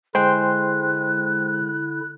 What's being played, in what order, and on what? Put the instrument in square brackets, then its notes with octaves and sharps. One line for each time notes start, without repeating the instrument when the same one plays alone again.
[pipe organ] D3 E4 [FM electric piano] G#3 [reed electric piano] C5 G5 C6 [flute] F#6